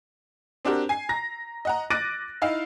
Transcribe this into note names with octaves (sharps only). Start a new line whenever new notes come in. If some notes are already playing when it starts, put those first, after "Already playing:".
C4 D4 F#4 G4 A#4
G#5 C7
A#5 A#6
D#5 F#5 A#5
D6 F#6 A6 A#6 D7 D#7
D#4 E4 F5